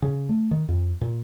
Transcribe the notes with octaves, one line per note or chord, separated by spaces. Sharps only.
C#3
A3
D#3
F2
A#2